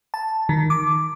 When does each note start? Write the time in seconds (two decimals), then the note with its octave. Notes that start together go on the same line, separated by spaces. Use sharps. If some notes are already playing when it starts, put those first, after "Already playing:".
0.14 A5
0.49 D#3
0.70 D6